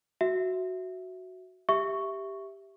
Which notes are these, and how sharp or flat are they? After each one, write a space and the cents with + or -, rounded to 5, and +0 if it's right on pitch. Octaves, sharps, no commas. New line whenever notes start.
F#4 +0 E5 +0
G4 +0 E5 +0 C#6 +0